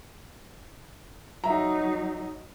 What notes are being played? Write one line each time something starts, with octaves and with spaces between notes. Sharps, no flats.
F#3 D#4 E5 A#5